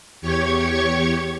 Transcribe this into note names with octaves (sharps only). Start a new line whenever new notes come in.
E2 G4 C#5 C#6 G#6